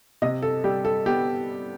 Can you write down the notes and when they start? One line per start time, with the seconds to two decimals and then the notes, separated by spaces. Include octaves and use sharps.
0.22 C3 D#5
0.42 A4
0.64 G3 G4
0.85 A4
1.06 B3 G4